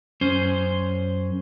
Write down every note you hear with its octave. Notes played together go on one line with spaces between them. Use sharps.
F#2 C#4 C5